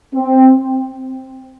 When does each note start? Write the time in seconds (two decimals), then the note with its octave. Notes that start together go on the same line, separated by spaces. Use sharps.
0.14 C4